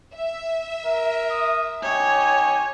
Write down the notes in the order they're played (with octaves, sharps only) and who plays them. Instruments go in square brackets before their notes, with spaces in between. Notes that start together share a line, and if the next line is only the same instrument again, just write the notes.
[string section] E5
[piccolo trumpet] A#4
[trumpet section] D#6
[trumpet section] D#4 G4 [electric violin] C#5 [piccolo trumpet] G#5